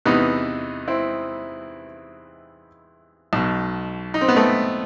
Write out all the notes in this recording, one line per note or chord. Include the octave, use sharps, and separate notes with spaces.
E2 C3 E3 B3 D#4
C4 E4
B1 B2
D#4
C4
B3
A3 C4